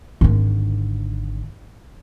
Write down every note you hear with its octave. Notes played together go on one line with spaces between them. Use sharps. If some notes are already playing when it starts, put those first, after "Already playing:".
G#1 D3